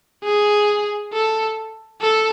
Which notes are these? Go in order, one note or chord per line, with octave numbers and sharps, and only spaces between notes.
G#4
A4
A4